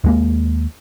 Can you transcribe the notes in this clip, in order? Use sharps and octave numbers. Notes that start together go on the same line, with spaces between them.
D#2 G#3 A#3